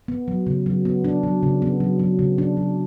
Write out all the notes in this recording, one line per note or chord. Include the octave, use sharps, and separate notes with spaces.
B3
F#3
C#3
F#3
B3
D4
F#3
C#3
B3
F#3
F#3
C#3
D4
F#3